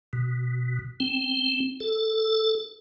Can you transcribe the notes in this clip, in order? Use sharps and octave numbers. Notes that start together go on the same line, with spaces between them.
B2
C4
A4